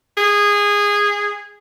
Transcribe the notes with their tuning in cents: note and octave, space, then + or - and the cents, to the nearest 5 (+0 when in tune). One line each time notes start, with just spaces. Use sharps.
G#4 -15